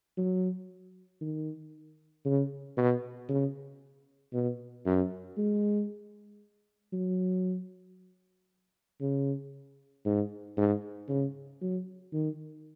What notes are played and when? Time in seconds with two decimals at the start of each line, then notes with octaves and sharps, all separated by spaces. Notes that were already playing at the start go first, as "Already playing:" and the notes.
0.17 F#3
1.21 D#3
2.25 C#3
2.77 B2
3.29 C#3
4.33 B2
4.86 F#2
5.38 G#3
6.93 F#3
9.01 C#3
10.05 G#2
10.57 G#2
11.09 C#3
11.61 F#3
12.13 D#3